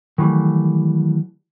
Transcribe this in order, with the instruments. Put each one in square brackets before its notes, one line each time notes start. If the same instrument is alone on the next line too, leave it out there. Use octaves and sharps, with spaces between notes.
[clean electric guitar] D#3 E3 F#3 G3 A3